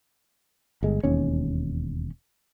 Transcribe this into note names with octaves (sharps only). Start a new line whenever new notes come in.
G1 G#3
E1 D#2 C#4